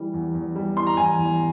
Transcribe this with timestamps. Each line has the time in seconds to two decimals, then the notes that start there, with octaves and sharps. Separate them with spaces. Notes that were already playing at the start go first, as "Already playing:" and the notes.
Already playing: E3 G3
0.13 E2
0.34 E2
0.55 G3
0.77 E3 C6
0.87 A#5
0.97 E2 G#5
1.17 E2